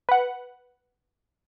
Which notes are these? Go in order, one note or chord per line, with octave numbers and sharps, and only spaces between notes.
B4 F#5